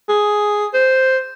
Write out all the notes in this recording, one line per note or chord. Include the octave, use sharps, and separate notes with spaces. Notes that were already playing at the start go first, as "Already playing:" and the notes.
G#4
C5